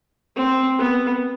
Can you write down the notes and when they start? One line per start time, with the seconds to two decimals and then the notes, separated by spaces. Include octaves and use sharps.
0.36 C4
0.78 B3